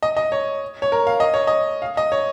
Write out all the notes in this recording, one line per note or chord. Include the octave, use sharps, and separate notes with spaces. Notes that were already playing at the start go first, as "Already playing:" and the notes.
D#5
D#5
C#5
C#5
A#4
F5
D#5
C#5
D#5
F5
D#5
C#5